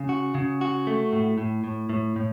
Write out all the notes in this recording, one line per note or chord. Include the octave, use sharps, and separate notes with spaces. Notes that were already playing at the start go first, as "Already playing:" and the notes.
Already playing: C#3
F#4
C#3
F#4
A3
A2
A2
A2
A2
A2